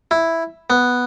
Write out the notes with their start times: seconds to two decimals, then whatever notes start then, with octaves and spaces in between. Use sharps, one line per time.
0.11 E4
0.70 B3